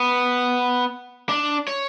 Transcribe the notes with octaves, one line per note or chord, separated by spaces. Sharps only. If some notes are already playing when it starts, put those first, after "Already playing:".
Already playing: B3
D4
C#5